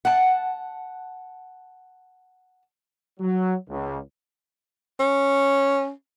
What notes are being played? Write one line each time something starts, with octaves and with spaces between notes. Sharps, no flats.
F#5 A5
F#3
C#2
C#4